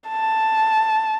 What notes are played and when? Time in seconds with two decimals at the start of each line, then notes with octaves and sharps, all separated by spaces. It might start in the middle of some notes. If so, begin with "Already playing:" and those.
0.09 A5